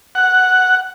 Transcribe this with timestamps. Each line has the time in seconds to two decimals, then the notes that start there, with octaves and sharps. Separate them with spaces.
0.15 F#5